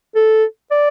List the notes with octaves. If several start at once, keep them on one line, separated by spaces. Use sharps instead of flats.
A4
D5